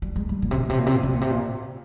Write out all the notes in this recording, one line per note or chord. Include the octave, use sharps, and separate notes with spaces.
G3
G#3
G3
A#2
C3
A#2
C3
A#2
C3
A#2
C3
A#2
C3
A#2